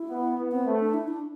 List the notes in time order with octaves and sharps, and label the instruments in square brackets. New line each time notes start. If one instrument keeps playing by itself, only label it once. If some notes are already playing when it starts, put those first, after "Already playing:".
Already playing: [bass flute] E4
[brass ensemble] B3
B3
[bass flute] C4
[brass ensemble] A3
[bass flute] D4
E4
D4